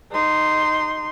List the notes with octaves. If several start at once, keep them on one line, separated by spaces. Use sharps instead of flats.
D#4 C6